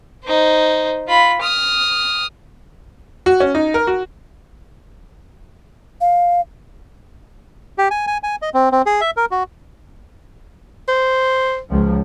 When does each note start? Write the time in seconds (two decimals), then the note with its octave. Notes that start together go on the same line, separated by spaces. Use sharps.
0.24 D#4 C5
1.08 F4 B5
1.41 D#6 F6
3.26 F#4
3.40 C#4
3.55 D#4
3.74 A#4
3.87 F#4
6.01 F5
7.78 G4
7.91 G#5
8.07 G#5
8.23 G#5
8.42 D#5
8.54 C4
8.72 C4
8.86 G#4
9.01 E5
9.17 A#4
9.31 F#4
10.88 C5
11.70 C#2 F3